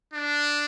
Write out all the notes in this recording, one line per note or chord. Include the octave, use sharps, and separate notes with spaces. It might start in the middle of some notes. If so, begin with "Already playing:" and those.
D4